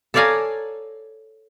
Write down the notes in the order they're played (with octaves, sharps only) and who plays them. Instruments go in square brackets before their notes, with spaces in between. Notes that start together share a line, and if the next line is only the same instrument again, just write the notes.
[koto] A4 C#5 D5 F5 G#5 A#5